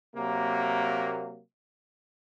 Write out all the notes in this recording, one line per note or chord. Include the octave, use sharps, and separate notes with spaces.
C3 F#3 A#3